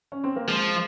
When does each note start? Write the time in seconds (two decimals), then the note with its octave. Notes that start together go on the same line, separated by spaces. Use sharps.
0.12 C#4
0.24 C4
0.36 A#3
0.48 F3 G#3